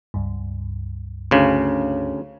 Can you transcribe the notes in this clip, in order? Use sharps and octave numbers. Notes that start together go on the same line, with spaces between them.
C#2 G2
D2 C#3